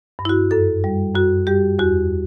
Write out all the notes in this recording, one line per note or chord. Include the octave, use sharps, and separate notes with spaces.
G2
E4
F#4
F#2 A4
G3
F#2 F#4
G3 G4
E2 F#4